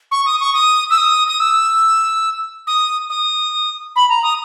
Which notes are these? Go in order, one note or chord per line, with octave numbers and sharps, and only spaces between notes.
C#6
D#6
C#6
D#6
E6
D#6
D#6
E6
D#6
D#6
B5
A#5
D#6